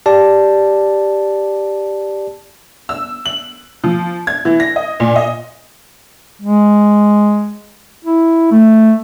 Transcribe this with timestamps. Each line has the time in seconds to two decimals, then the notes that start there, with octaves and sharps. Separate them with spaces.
0.06 G4 D5 A5
2.89 E6
3.26 F#7
3.84 F3
4.27 G#6
4.45 E3
4.60 A#6
4.76 D#5
5.00 A#2
5.16 D#5
6.42 G#3
8.05 E4
8.51 A3